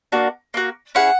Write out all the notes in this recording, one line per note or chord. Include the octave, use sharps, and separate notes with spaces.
A#3 D4 F#4
A#3 D4 F#4
C#4 E4 G#4 F#5